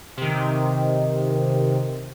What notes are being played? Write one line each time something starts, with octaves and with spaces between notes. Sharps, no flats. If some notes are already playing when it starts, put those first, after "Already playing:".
C3 D#3